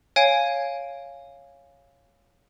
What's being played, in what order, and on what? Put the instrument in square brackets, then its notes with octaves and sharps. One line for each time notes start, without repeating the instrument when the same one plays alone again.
[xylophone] C#5 F5 G#5 G#6 D7